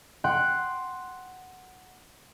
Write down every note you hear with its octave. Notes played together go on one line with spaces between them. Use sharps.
F#5 G5 C6